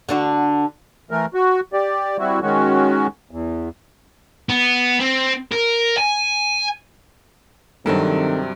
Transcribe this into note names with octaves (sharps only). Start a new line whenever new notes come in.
D3 D4 F#4
E3 A3 A#4
F#4
G4 D5
G3 C4 E4 F#4
D#3 G#3 C#4 F#4
E2
B3
C4
A#4
G#5
G2 C3 D#3 F#3 C4 A4 A5